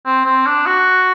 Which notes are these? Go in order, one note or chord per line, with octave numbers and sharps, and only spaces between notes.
C4
C4
D4
F#4